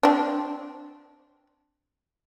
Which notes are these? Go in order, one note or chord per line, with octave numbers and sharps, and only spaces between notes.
C4 D4